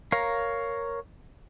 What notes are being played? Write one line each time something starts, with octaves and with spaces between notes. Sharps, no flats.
A#4 C#5 F5 A#5